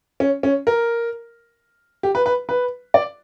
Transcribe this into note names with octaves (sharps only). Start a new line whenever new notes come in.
C#4
C#4
A#4
G4
B4
B4
B4
D5